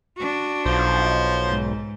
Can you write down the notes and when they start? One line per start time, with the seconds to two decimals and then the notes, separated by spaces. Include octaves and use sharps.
0.17 D4 F#4
0.66 B1 F3 C5
1.47 G#2